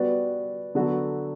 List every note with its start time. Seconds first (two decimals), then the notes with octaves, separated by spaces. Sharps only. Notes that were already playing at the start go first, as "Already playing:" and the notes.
Already playing: G3 B3 F#4 B4 D5
0.75 D3 F#3 B3 F#4 A4